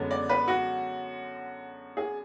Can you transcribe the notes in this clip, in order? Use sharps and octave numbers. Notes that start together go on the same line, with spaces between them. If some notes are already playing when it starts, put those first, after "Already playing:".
Already playing: F#2 D3 G#3 B3
D5
B4
F#4
G#4